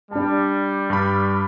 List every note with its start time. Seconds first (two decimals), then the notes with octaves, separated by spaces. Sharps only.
0.11 G3 D4 A5
0.90 G2 B5